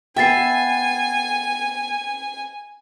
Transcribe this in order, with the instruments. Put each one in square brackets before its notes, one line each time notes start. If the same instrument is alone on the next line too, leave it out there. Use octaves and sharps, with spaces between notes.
[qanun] B3 E5 [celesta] G5 A6 C7 [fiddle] G#5